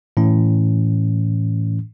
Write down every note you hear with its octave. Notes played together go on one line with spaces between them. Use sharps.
A2 E3 C#4